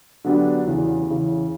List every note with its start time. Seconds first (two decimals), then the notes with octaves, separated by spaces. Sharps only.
0.24 D3 F#3 B3 D4 G4
0.67 E2 C#3 E3
1.09 E2 C#3 E3